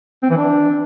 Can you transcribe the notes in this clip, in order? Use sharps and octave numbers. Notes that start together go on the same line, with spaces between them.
C4
E3
D4